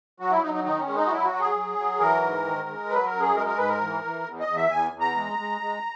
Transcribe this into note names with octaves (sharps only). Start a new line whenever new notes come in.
F#3 F#4
E4
F#3 D#4
D#4
D#3 D#4
C#4
G#3
D#4
F#4
F#3 E4
F#4
F#3
G#4
F#3
F#3
E3 A#4
G#2
D#3
G#3
F#3 B4
A#4
F#2
G#4
G#3 A#4
A#4
G#2 B4
A#4
E3
E3
E2
D#5
E2
E5
E2 G#5
E2
A#5
G#3
G#3
G#3